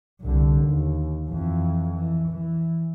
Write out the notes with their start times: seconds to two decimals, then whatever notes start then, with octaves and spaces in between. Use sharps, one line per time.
0.21 C2 D3
0.63 D#2
1.28 F2 E3
1.90 E3
2.28 E3